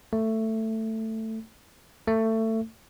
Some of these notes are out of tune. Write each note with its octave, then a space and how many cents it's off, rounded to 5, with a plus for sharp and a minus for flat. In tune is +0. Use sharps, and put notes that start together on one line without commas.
A3 +10
A3 +20